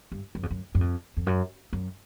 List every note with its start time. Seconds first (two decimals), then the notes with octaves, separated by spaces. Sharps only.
0.12 G2
0.35 F#2
0.43 F2
0.50 F#2
0.75 F#2
0.81 F2
1.17 F2
1.26 F#2
1.73 F#2